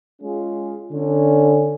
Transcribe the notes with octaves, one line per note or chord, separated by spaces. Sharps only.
G#3 C#4 F4 G#4
D3 C#4